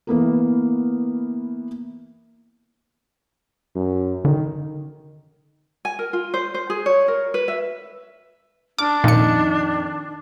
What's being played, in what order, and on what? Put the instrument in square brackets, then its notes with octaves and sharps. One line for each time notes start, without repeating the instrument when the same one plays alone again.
[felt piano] E3 A#3 B3 A#4
[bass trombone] F#2
[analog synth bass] D3 [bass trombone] D#3
[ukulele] G#5
A#4
F4
C5
C5
G#4
C#5
A#4
B4
E5
[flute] D4 [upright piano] A5 F6 [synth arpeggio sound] D6
[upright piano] F2 D#3 D#4 [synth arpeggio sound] A#2 C#7